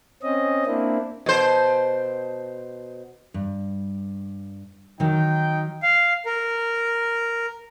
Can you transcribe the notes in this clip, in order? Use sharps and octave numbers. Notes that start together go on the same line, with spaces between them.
C4 C#4 D#5
A#3 C4 D4 E4
B2 C5
G2
D#3 F#3 D#4 G5
F5
A#4